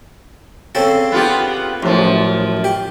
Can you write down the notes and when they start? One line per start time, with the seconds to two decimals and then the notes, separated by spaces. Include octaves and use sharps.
0.75 C#3 C4 A4
1.12 B3 F4 G4
1.83 A1 F#2 F3
2.64 G4